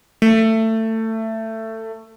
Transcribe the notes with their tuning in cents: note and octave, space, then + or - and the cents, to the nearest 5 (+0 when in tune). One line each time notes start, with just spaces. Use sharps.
A3 +20